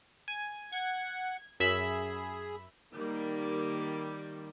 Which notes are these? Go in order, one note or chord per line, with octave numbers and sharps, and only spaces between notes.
G#5
F#5 G#6
F#2 G#4 E5 B5
D#3 G3 A#3